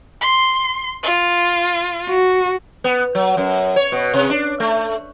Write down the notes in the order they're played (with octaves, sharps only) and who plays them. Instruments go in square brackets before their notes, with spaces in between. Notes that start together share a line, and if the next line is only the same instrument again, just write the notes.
[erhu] C6
F4
[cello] F#4
[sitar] B3
F#3
F#2
C#5
B2
C3
D4
A3